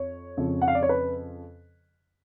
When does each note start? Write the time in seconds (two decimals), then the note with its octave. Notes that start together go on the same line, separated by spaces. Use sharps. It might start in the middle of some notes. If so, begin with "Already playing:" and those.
Already playing: F2 C#5
0.37 F2 C#3 F3
0.62 F#5
0.68 F5
0.75 D5
0.83 C#5
0.89 B4